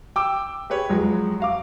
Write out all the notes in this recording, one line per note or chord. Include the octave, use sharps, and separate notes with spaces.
G5 D6 E6
G4 G#4 B4 C#5
F2 F#3 G#3
F#4 F5 D6